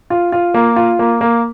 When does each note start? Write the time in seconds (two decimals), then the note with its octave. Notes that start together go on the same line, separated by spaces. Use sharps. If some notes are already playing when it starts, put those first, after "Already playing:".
0.10 F4
0.32 F4
0.54 A#3
0.76 F4
0.99 A#3
1.21 A#3